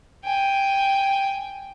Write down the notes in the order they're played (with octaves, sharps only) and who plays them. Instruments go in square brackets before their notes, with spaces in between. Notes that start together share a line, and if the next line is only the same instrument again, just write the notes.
[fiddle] G5 G#5